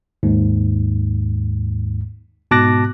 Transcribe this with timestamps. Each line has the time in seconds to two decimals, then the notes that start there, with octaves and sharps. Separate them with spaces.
0.23 D#2 G#2
2.51 G#2 B2 A5 D6 F#6 A#6